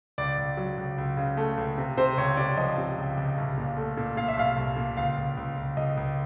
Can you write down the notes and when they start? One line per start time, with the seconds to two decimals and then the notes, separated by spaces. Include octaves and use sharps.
0.18 C#2 D5
0.38 C#2
0.57 F#3
0.78 C#2
0.98 C#2
1.17 C#3
1.37 A3
1.57 C#2
1.78 C3
1.97 C3 C5
2.17 C#2 C#5
2.37 C3 D5
2.57 F3 D#5
2.78 C3
2.98 C#2
3.17 C#2
3.38 C2
3.58 A#2
3.77 A3
3.97 A#2
4.17 A#2 F5
4.28 E5
4.37 C2 F5
4.57 C2
4.76 A#2
4.97 C#2 F5
5.17 C#2
5.37 C#2
5.57 C#2
5.77 C#2 D#5
5.97 C#2